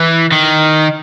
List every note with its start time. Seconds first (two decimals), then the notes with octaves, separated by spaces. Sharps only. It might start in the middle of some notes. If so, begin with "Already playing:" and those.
Already playing: E3
0.32 D#3